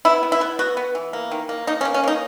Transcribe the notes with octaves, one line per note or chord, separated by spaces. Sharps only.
B3 E4
B3
E4
B3
B3 F#4
B3
E3
A#3
D#3
A#3
A#3 D#4
C#4
A#3
C#4
A#3 D#4